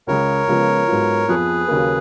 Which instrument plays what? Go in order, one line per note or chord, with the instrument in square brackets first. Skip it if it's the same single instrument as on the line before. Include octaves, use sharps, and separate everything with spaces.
[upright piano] C#2 C#3 G#3 [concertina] A#4 C#5
[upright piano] C#2 C#3 F3 G#3 B3
G#2 F#3 B3 F4
[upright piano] F2 F3 B3 [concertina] G#4 B4
[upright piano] D#2 C#3 F#3 A#3